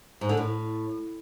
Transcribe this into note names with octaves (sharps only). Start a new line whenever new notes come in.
G#2
D3
A2